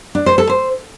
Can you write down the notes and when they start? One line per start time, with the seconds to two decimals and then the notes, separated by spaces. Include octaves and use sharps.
0.15 D4
0.26 C5
0.38 A4
0.49 C5